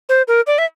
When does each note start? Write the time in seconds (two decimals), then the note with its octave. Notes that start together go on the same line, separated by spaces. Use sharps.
0.09 C5
0.28 A#4
0.47 D5
0.58 E5